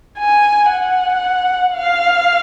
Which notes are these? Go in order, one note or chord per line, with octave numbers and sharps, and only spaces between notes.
G#5
F#5
F5